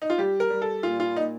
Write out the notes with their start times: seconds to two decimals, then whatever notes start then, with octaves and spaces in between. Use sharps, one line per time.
0.02 D#4
0.10 F4
0.18 G3 G4
0.40 A#4
0.50 G3
0.62 A4
0.83 A#2 F4
1.00 F4
1.16 A#2 D#4